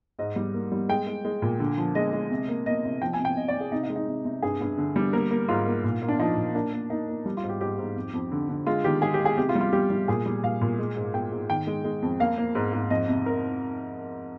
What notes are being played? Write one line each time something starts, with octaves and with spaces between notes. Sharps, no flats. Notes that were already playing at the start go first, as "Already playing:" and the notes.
G#2 D#5
G3
A#3
G3
G#3 G5
G#3
G#3
A#2
D3
F3
G#3 D#5
G#3
C3
A#3
A#3 D#5
C3
F3 G5
G#5
C3
G5
C3 D#5
D5
C3
G#4
C3 D#4
D#4
G#3
D#4
C3
C3
G2 G#4
G2
D3
G3
A#3 A#4
A#3
G#2 F4
A#3
A#2
A#3
D4
F3 D#4
A#2
A#3 D4
A#3
A#3 D#4
A#3
G3
F4
G#2
G4
G#2 G4
G#2
F2
F2
D3
D3
G#3 F4
D#3 G4
G#3 G#4
G4
G#3
G#4
C3 G4
F4
G3
F4
G3 G4
G3
A#2 G#4
G3
A#2 F5
A#2
G#3
G#2
G#3 G5
G#2
D#3 G5
G#3
G#3
F2
A#3 F5
A#3
G#2
G#2
F2 D#5
C3
C3 A#4